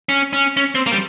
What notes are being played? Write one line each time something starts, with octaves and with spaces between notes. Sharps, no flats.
C#4
C#4
C#4
C4
A#3
G3